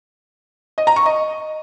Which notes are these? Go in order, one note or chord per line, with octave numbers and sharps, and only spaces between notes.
D#5
A#5
C#6
D#5